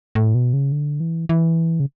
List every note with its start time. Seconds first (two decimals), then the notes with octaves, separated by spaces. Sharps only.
0.15 A2
0.35 B2
0.53 C#3
0.72 D3
1.00 E3
1.29 E3
1.80 C#3